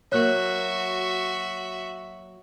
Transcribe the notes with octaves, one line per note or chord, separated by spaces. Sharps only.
F#3 A#3 F#4 C#5 E5 F#6